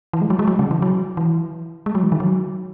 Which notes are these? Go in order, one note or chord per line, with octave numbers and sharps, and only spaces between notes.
E3
G#3
F#3
G#3
F#3
C#3
E3
F#3
E3
G#3
F#3
E3
D#3
F#3